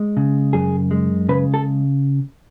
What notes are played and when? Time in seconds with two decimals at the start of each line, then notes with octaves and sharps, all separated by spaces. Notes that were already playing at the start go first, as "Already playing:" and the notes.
Already playing: G#3
0.17 C#3
0.53 F#2 G#4
0.91 G#3
1.29 C#3 B4
1.54 A4